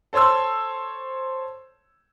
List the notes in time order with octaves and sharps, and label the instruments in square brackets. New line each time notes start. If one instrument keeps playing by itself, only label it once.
[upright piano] A4 C5 C#5 C6 E6